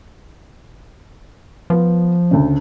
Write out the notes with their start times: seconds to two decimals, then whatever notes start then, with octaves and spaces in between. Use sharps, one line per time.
1.70 F3 B3
2.31 D2 C#3